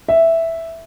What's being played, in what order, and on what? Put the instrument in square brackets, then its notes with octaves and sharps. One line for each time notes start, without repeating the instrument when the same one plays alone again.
[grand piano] E5